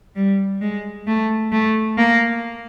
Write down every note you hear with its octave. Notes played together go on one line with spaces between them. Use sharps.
G3
G#3
A3
A3
A#3